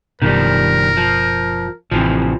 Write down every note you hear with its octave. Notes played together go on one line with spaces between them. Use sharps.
F#1 B2 D#3 F3 G3 A#4
F3
A1 C3 E3 F3